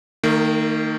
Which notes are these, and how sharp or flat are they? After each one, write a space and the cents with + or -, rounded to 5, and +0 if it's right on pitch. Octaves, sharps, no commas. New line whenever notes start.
D#3 +0 A#3 -45